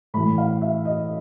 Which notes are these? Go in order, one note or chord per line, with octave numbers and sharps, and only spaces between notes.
A2 E3 B5
F5
E5
D#5